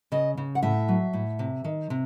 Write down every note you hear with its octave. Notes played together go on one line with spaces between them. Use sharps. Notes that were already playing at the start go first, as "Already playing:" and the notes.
C#3 D#5
C#3
F#5
A2 E5
F#3
A2
C3
D#3
C3